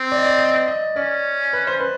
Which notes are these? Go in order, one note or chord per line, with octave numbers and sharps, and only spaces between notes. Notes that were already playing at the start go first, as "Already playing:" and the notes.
Already playing: C4
D5
D#5
D5
D#5
D#5
C#4 D5
B4
C5
B4